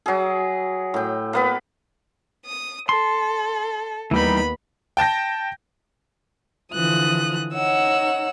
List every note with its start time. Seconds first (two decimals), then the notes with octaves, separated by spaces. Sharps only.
0.06 F#3 G#4
0.94 A2 G5
1.33 A#3 B3 B4
2.45 D#6
2.89 A4 C6
4.11 D#2 E3 G3 B3 D#4 B5
4.97 G5 A5 G6 A#6
6.72 D3 E3 F3 D#6 F#6
7.53 D#4 C#5 F#5 E6